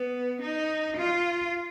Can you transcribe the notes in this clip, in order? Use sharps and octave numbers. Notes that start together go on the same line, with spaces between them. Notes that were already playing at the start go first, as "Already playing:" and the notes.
Already playing: B3
D#4
F4